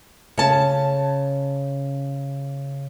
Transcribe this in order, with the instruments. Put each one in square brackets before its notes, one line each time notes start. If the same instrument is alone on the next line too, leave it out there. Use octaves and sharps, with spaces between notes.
[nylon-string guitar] C#3 A5